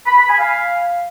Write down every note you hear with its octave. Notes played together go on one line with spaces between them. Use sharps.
B5
B5
G#5
F5